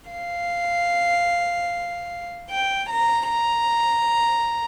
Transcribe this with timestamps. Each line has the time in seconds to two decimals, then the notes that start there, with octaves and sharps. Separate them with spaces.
0.11 F5
2.51 G5
2.90 A#5
3.31 A#5